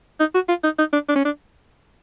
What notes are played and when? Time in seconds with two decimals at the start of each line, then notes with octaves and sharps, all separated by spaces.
0.20 D#4
0.34 F#4
0.49 F4
0.64 D#4
0.79 D#4
0.93 D4
1.08 D4
1.16 C#4
1.25 D4